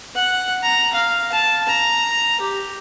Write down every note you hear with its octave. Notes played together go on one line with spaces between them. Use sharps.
F#5
A#5
F5
A5
A#5
G4